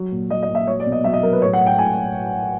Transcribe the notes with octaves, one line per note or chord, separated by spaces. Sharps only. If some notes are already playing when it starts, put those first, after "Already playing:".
Already playing: F#3
A#2
F#3 D#5
D#5
A#2
E5
F#3 C#5
D5
B2
D#5
F#3 E5
D#5
F#3 A#4
B4
A2 C#5
F#5
A2
G5
A2 G#5